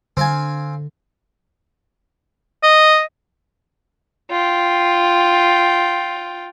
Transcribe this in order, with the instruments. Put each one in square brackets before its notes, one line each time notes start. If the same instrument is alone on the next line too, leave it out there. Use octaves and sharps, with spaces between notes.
[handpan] D3 [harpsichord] C4 F5 G#5
[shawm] D#5
[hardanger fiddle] F4 G5